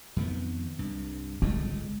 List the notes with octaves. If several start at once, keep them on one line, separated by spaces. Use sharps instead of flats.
F2 D#3 B3
C2 G2
G1 C#2 A2 G#3